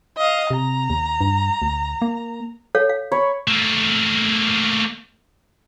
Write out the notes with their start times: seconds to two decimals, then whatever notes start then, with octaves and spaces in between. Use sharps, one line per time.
0.17 D#5 F5
0.50 C3 A#5
0.90 D#2
1.21 G2
1.62 D2
2.02 A#3
2.75 A4 C#5 F5
2.89 F5
3.12 C#5 B5
3.48 A3 A#3